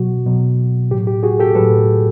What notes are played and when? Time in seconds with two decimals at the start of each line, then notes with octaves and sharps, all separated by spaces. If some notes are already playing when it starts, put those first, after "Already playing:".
Already playing: B2 F#3 F#4
0.26 B2 F#3
0.91 A2 F#3 G4
1.07 G4
1.23 F#4 G#4
1.40 G4 A4
1.55 A2 F#3 A4 B4